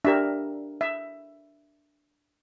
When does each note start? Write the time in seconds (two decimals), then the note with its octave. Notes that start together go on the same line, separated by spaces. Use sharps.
0.05 D4 G4 A#4 E5
0.81 E5